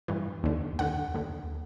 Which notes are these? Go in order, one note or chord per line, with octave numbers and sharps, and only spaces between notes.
G2 E3
D#2 D3
D#2 D3 F#5
D#2 D3